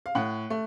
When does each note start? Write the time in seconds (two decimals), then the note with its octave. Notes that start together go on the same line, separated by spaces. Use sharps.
0.06 F5
0.15 A2 F#5
0.50 A3